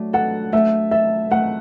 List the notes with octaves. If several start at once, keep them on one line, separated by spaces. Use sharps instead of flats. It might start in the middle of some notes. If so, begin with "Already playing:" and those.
Already playing: F#3 A3 D4
A4 F#5
A3 E5
A4 E5
A3 F#5